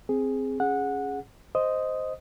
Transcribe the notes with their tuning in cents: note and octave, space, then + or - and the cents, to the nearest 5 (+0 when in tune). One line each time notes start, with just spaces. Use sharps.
C4 +0 G#4 +0
C#4 +0 G#4 +0 F#5 -15
C5 -5 D#5 +0 D#6 +0